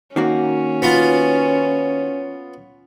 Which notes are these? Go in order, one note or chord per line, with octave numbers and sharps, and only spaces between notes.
D#3 A#3 C#4 F#4
B3 F4